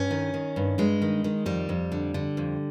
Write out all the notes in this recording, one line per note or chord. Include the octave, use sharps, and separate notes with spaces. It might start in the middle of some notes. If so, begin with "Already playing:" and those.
Already playing: G2 C#4
D#3
D#3
G2
G2 G#3
D#3
D#3
F2 G3
F2
D3
D3
F2